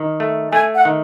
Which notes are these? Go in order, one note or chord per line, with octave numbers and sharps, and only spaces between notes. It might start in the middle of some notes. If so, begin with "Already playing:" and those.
Already playing: D#3
A3
A3 G#5
F#5
D#3